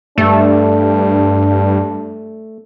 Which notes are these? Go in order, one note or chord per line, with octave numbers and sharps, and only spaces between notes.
G2 A3 D4